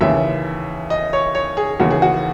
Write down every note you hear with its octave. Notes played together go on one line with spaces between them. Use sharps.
D#2 C#3 E3 E5
D#5
C#5
C#5
G#4
D#2 C#3 E3 F#4
G#4
F#4